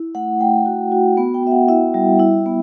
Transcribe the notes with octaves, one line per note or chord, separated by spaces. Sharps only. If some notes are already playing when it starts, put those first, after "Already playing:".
Already playing: E4
A3 F#5
A3 G5
F#4
F#4
B3
G5
B3 E5
F#5
E4 E5
G3
E4
B3